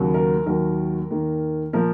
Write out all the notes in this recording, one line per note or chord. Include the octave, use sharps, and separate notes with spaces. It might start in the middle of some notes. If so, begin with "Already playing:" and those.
Already playing: D#2 C#3 F#3 A#3
A#4
D#2 D#3 F#3 A#3 A#4
D#2 D#3 A#3
A#2 F3 A#3 A#4